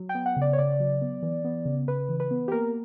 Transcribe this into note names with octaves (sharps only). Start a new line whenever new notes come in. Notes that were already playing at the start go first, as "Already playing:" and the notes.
Already playing: F#3
G5
B3
F#5
C#3
D5
C#5
C#3 D5
F#3
B3
E3
B3
C#3
C#3 B4
E3
B4
B3
G4
A#3 A#4